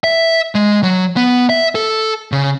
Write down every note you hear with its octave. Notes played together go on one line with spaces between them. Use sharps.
E5
G#3
F#3
B3
E5
A4
C#3